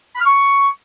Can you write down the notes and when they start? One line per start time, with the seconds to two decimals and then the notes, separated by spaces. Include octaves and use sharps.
0.16 B5
0.21 F6
0.26 C#6